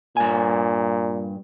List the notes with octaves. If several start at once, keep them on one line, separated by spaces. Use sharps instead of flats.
G2 A#2 G#5